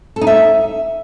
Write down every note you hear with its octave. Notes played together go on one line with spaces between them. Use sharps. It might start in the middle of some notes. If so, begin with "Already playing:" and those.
A4
D#4
E5